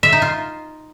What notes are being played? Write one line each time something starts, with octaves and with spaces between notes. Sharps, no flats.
E5
D#4
F4